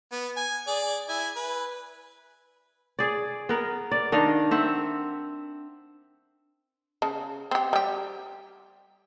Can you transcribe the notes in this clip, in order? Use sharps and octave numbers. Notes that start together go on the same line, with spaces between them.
B3
G#5
G#4 D5
E4 G#5
B4
G#4 D5
B3 A#4
D5
D#3 D4 D#5 F5
C4 E5 F#5
C#3 A5
C4 G4
G3 G4